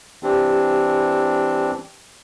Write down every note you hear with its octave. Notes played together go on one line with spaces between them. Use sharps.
E3 C4 D4 G4